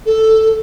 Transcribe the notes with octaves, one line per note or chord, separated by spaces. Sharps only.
A4